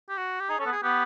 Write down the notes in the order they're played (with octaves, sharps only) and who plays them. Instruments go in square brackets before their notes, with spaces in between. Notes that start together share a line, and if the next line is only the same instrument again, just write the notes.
[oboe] G4
F#4
G4
[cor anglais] D#4 [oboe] G#4
[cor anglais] C#4 [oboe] A4
[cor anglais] B3
[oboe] G#4
[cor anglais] B3 [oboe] G4